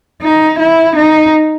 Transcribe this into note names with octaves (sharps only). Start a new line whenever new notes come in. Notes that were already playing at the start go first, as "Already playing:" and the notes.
D#4
E4
D#4